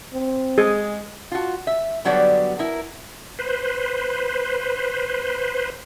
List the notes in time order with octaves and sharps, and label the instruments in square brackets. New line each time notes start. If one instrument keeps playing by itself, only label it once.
[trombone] C4
[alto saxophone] G#3 [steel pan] G#4
[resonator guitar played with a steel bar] F4 F#4
E5
D3 F#3 G3 B3 F#4 D5
E4 A#4
[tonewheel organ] B4 C5